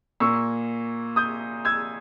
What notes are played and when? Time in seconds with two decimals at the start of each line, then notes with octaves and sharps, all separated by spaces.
0.20 A#2 A#3 C#6 E6
1.16 D#6 G6
1.65 E6 G#6